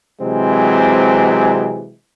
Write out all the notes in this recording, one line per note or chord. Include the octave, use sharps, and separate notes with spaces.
C3 E3 F#3 G#3 C4